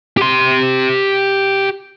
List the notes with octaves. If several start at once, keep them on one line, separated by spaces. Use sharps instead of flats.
G4 C6